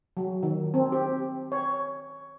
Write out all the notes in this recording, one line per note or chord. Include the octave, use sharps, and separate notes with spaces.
F#3
D#3
C4
G4
C#5